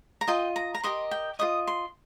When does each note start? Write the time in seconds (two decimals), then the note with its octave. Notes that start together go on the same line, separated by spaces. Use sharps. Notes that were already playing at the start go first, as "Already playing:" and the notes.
0.21 A#5
0.28 F4 D#5 G5
0.56 A#5
0.74 A#5
0.84 G4 A#4 D#5 C6
1.11 G5
1.39 F4 C5 D#5 D#6
1.67 C6